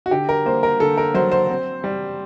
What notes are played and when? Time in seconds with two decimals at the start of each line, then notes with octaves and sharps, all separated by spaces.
0.06 F#4
0.11 D3 G4
0.29 A#4
0.46 A#3 C5
0.63 A#4
0.80 D3 A4
0.97 A#4
1.14 F#3 C5
1.32 C5
1.49 C4
1.84 G3